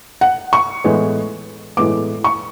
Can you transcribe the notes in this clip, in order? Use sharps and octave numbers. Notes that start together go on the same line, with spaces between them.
F#5
C#6
A2 E3 G#3 B3
A2 E3 G#3 B3 D6
C#6